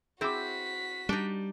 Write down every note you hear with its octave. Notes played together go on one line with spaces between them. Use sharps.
C4 E4 F#4 G#4 C5 D6 B6
G3 D4 D#4